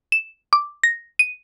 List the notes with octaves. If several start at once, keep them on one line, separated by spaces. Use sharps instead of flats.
E7
D6
A#6
D#7